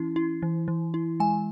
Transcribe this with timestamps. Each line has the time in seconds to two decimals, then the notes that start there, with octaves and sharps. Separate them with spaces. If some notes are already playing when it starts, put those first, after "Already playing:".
Already playing: E3 C#4 E4
0.16 E4
0.42 E3
0.68 E3
0.94 E4
1.20 G#3 G#5